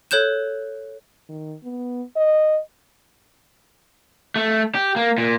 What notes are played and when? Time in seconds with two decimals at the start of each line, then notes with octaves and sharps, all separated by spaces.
0.11 A4 C#5 F#6 G6 E7
1.29 D#3
1.63 B3
2.16 D#5
4.36 A3
4.75 G4
4.96 A#3
5.18 A#2